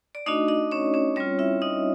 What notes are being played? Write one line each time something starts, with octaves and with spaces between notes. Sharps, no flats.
D5
A3 D4 D#4 F#4 D#5
D#4 D#5
C#4 C#5
C#4 C#5
G3 C4 C#4 F4 C#5
E4 E5
D#4 D#5